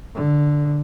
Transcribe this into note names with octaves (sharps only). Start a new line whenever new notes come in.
D3